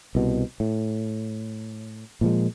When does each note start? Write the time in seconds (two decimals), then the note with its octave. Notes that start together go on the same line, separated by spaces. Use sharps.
0.15 C2 B2
0.60 A2
2.21 A#2 F3 G#3